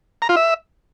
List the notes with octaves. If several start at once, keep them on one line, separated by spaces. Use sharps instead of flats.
A#5
F4
E5